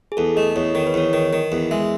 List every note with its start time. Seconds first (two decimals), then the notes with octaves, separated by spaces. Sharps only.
0.12 G#4
0.17 E2 A4
0.37 A3 D#5
0.56 E2 C#5
0.75 D#3 C#5
0.87 B4
0.94 E2 C#5
1.13 D#3
1.33 D#3
1.52 E2
1.71 G#3 E5